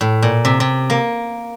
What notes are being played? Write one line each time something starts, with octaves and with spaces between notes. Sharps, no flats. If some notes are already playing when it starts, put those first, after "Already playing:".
A2
A#2
C3
C3
A#3